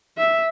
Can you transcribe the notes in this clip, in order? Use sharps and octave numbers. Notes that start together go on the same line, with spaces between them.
E5